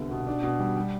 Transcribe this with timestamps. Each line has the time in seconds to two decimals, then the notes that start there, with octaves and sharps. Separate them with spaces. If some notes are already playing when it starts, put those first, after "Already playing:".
Already playing: C2 D3 B3
0.11 B2
0.27 D4
0.43 B2
0.60 G3
0.76 G3